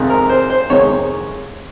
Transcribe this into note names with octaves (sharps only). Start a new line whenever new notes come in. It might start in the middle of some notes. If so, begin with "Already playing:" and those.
Already playing: F2 C3 D#3 G#3
A#4
C5
C5
F2 C3 D#3 G#3 C#5